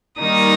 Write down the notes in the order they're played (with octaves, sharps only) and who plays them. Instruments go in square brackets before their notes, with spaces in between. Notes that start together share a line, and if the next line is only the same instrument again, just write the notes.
[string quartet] D#3 G3 A#3 D#4 D#6